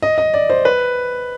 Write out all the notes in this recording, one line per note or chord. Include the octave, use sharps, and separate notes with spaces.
D#5
D#5
D5
C5
B4